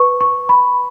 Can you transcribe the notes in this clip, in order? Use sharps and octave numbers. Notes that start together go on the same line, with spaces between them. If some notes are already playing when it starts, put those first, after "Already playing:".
Already playing: B4 C#6
C#6
B5